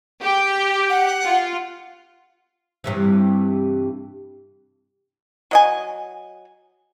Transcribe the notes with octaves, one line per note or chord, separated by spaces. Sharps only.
G4
F#5
F4
G2 C3 E3
F#3 D#5 G#5